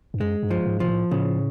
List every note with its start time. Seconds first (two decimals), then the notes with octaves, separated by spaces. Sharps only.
0.14 G2
0.20 F#2 G#3
0.43 G2
0.50 F3
0.66 G#2
0.80 A#2 F3
0.88 A2
1.11 A2 C#3